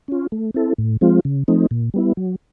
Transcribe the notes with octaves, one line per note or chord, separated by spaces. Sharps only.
C#4 F4
A3
C4 E4 A4
A2
F3 G#3 C4 F4
C#3
F3 A3 C4 D#4
A#2
G3 B3 E4
F#3